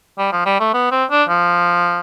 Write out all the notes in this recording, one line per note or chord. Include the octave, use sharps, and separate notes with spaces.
G3
F3
G3
A3
B3
C4
D4
F3